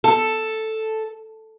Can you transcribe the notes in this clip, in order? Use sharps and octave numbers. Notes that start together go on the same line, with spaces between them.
A4